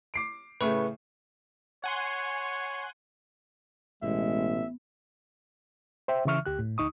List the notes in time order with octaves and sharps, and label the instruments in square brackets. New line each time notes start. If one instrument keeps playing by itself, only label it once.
[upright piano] D6 C7 D7
[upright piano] A2 C#3 A3 [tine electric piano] B4 C#6
[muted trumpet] C#5 [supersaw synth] F#5 G#5 C6
[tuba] A1 [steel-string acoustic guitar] B2 [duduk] G#3 [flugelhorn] E5
[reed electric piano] C5 E5 G5
C#3 E3 E5 C#6 F6
D2 G4 F#6
A2
D2 D#4 C#6 D#6